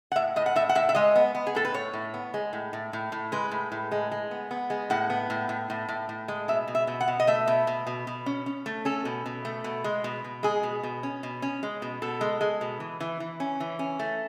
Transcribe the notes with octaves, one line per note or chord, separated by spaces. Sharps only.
F#5
A2 E5
A2 D#5
F#5
A2 E5
F#5
A2 E5
E5
G#3 D#5
B3
B3
G#4
A2 A4
B4
A2 C#5
A2
B3
G#3
A2
A2
A2
A2
G#3 B4
A2
A2
G#3
G#3
B3
B3
G#3
A2 F#5
B3
A2
A2
A2
A2
A2
G#3
B2 E5
B2
E5
B2
F#5
B2
D#5
A3 E5
B2
B2
B2
B2
C#4
C#4
A3
C#4 A4
B2
B2
A3
B2
G#3
B2
B2
G#3 G#4
B2
B2
C#4
B2
C#4
G#3
B2
B2 A4
G#3
G#3
B2
E3
E3
E3
C#4
E3
C#4
A3